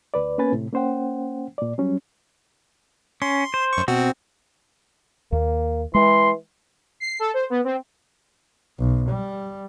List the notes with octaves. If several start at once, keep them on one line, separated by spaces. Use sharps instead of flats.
D2 B4 D5
A#3 B3 C#4 B4 G#5 A6
A2 C3
A#3 C#4 C5 F#5 G5
A#2 D5
F#3 G3 C#4
C#4 C6
C5
F#2 C#6
B2 C4 F#4
D#2 A#3
E3 G#3 C6
C7
A4
C5
B3
C4
B1
G3